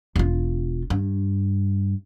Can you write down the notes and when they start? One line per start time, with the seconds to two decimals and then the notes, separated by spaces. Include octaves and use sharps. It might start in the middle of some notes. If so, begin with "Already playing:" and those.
0.16 E1 F4
0.90 G2